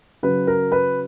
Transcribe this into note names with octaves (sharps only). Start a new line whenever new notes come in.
C#3 F#3 B4
A#4
B4